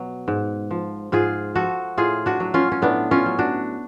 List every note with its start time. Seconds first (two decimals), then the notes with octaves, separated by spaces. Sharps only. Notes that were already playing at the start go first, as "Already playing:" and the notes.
Already playing: B2 F#3
0.28 G#2
0.71 F3
1.12 G#2 F4 G#4
1.55 F3 F#4 A4
1.97 A2 F4 G#4
2.26 D4 F#4
2.40 F#3
2.54 C#4 F4
2.72 C#4
2.82 A2 B3 D4
3.11 C#4 F4
3.26 F#3
3.39 D4 F#4